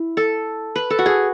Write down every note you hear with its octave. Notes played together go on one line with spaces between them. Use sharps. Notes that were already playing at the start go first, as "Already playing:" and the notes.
Already playing: E4
A4
B4
A4
F#4
G#4